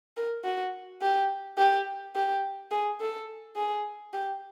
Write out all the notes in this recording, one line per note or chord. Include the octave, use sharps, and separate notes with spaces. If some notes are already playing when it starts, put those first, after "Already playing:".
A#4
F#4
G4
G4
G4
G#4
A4
G#4
G4